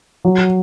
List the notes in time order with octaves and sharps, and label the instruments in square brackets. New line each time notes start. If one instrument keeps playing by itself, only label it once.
[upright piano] F#3